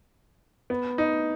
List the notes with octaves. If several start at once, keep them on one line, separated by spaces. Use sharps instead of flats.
B3
D#4